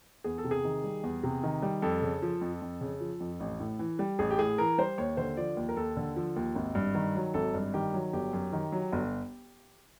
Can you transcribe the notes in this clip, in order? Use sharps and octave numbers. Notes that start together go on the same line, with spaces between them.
E2 G#4
A4
C3
G#4
D#3
G3
E2
C3
D#3
G3
F2 A4
C#3
F3
F2
F2
C#3
F3
F2
A1
A2
E3
G3
A1 G#4
G4
A2 G#4
E3 A#4
G3 C5
D#2 C#5
D3 C5
F3 D5
D#2
A#4
D#2 A4
D3
F3
D#2
G#1
G2
D#3
F#3
G#1 A4
G2
D#3 G4
F#3
G1 G4
F#2
D#3
F#3
G1